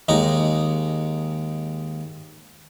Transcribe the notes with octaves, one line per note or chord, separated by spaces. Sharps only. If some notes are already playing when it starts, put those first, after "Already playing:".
D#2 G#3 D#4